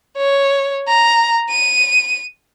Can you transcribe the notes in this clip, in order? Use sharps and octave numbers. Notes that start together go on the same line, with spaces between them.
C#5
A#5
D#7